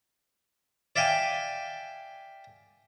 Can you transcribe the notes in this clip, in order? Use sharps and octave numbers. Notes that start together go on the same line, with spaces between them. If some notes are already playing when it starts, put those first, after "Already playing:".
D5 E5 F5 G5 G#5